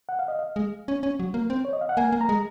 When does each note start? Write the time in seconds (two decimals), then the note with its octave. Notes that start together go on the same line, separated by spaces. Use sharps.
0.09 F#5
0.19 F5
0.28 D#5
0.39 F5
0.56 G#3
0.88 C#4
1.03 C#4
1.20 F#3
1.34 A#3
1.50 C4
1.65 C#5
1.73 D#5
1.81 F5
1.89 F#5
1.97 A#3 G#5
2.12 A#3
2.21 A#5
2.29 G#3